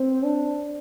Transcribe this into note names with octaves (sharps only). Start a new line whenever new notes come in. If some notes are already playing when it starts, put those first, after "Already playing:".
Already playing: C4
D4